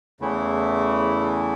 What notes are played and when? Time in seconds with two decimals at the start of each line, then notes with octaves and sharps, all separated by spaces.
0.20 E2 C#3 E3 A3 E4